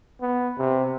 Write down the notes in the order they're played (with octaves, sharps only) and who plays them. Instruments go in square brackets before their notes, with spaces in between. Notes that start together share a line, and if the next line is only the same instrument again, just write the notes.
[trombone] B3
C3